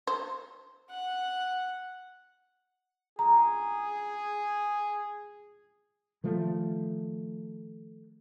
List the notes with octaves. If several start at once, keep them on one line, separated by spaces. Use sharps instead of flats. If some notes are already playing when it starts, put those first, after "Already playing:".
C5
F#5
G#4 A#5
D#3 F3 A3